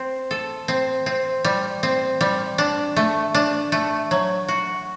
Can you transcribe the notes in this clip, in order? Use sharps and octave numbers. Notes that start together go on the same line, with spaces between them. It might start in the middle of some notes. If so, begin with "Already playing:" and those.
Already playing: C4
A4
C4
C4
G3
C4
G3
D4
A3
D4
A3
F#3
F#4